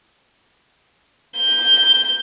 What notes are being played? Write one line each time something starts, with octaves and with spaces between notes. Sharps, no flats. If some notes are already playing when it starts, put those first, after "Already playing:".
G6